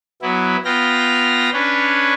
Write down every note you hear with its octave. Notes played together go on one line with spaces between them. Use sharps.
F#3 B3 E4
B3 F4 G5 F6 A#6
C#4 D4 B4 C#5